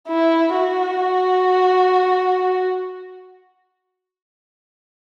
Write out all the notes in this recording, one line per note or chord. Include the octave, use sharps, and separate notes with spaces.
E4
F#4